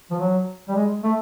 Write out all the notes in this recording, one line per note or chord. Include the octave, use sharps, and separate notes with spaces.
F3
F#3
G3
G#3
A3